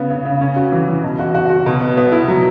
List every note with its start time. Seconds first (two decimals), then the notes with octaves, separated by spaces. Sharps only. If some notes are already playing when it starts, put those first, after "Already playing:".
Already playing: C#3 B3
0.10 C#3
0.25 C#3
0.41 C#4
0.56 F#4
0.72 E3
0.88 E3
1.04 B2
1.19 F#4
1.34 F#4
1.50 F#4
1.66 B2
1.81 B3
1.97 B3
2.12 E4
2.28 F#3